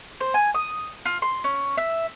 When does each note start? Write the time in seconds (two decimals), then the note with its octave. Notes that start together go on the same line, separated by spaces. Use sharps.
0.21 C5
0.34 G#5
0.54 D#6
1.06 F4
1.22 C6
1.44 C#4
1.77 E5